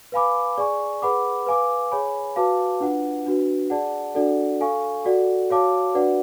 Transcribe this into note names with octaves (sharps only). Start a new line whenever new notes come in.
B4 F5 G#5 B5 D6
G#4 D5 G#5 C#6
G#4 B4 F#5 B5 D6
B4 F5 G#5 D6
G#4 C#5 G#5 B5
F#4 B4 F5 A5 D6
D4 F4 B4 F#5
D4 F#4 B4
G#4 D5 F#5 A5
D4 F#4 A4 D5 F#5
A4 F5 G#5 C#6
F#4 A4 D5 F#5
F#4 C#5 F5 A5 D6
D4 F#4 B4 D5 F#5